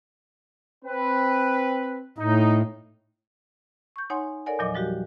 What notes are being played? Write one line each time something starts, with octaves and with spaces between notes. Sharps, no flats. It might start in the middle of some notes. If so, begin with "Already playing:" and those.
C4 B4
A2 D#4
C#6 G6
D#4 C#5 F#5 G#5 C6
A4 A#4 C#5 D5 F#5 G#5
E2 A#2 F3 F#3 D#5 D6
F3 G3 F#4 G4